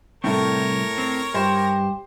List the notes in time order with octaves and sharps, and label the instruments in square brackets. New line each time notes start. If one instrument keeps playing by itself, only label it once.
[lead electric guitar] C2 C4 [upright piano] A2 A3 [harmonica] A#4 C#5
[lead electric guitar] C4
[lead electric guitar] G2 [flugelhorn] G4 [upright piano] C5